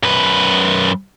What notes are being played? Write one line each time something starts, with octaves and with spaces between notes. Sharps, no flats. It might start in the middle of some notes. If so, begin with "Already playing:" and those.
F#2 B4